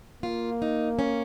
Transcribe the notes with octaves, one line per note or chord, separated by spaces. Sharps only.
A#3 F4
D#4
C#4